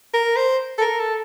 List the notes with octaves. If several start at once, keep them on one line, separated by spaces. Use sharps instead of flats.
A#4
C5
A4
A#4
A4